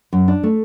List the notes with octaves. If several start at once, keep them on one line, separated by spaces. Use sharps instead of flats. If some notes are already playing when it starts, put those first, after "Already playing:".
F#2
D4
A3